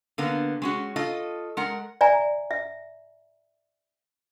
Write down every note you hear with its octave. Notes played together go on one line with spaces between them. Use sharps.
D3 A#3 B3
G#3 C#4 F#4
F4 A4 D#5
G#3 A#4 F#5
D5 E5 G#5 A#5
E5